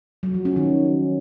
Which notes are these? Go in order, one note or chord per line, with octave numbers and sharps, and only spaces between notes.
F#3
F3
C#4
D#3